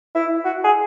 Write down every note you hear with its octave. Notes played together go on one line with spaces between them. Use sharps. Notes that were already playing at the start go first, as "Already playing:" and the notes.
E4
F#4
G#4